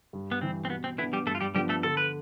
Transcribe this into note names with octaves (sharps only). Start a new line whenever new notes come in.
G2
B3
E3 G3 C4
C4
B2 B3
C4
E3 B3 D4 E4
G3 G4
G2 A3 A4
F4
G3 G4
F3 G3 B3 D4 G4
A3 A4
D3 A4
B4